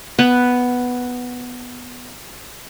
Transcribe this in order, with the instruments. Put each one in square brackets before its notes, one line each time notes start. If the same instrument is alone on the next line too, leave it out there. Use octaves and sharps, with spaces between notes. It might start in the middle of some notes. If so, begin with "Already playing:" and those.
[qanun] B3 B4